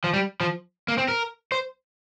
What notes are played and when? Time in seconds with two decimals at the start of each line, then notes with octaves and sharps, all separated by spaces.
0.04 F3
0.14 G3
0.41 F3
0.88 A#3
0.98 C4
1.08 A#4
1.52 C5